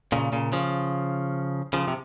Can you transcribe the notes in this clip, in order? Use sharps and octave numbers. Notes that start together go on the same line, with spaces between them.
A#2 C#3
A#2 C#3
C#3 F3
C#3 F3
C3